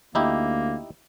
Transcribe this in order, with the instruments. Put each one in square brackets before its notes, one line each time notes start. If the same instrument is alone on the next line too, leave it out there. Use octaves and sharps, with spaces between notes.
[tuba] D2 [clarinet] A#3 [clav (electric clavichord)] D#4 E4 G4